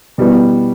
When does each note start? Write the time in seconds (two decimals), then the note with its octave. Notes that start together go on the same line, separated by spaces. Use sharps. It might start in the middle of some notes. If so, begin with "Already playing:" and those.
0.18 B2 G3 B3 E4